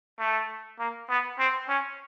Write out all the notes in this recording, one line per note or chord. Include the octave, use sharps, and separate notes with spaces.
A3
A#3
B3
C4
C#4